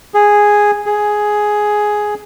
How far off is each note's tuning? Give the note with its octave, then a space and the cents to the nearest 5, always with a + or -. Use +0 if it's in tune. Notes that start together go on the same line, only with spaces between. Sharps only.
G#4 -5
G#4 +5